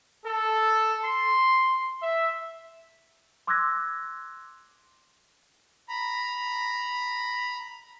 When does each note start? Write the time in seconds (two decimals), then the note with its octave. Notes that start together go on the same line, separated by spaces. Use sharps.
0.24 A4
1.04 C6
2.01 E5
3.47 C6 D6 E6 F#6 G#6 A#6
5.89 A#5 B5